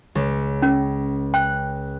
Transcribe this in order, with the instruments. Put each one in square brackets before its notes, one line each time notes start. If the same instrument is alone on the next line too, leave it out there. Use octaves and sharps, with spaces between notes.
[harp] C#2
[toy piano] C#4
[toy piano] G5 [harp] F#6